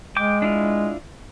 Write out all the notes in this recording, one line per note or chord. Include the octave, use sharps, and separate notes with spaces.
G#3 G5 D6
D4 E4 F4